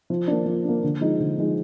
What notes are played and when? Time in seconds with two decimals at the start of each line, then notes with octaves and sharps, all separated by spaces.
0.10 F3
0.28 A#3 D4
0.46 F3
0.65 A#3 D4
0.84 D3
1.01 F3 G#3 D#4
1.20 D3
1.38 F3 G#3 D#4